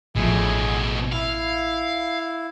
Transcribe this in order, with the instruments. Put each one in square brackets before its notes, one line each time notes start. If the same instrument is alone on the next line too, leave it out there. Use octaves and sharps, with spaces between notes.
[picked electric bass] A1 F3 [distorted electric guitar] B2 A3 [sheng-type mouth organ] G#4 D#5
[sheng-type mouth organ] E4 [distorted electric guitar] F5